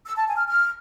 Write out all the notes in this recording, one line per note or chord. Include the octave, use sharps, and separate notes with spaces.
E6
A5
G#5
F6
F6